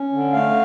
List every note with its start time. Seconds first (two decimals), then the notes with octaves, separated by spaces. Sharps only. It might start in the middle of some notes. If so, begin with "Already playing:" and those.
Already playing: C#4
0.13 D3
0.33 A3 F5